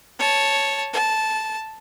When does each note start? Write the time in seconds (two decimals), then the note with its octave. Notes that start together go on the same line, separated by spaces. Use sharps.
0.19 C#5 A5
0.93 A5